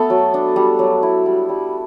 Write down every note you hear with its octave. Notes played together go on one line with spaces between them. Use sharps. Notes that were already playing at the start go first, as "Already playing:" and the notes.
Already playing: A3 B3 A4
F#3
D4
G3
F#3
E4
G3
G3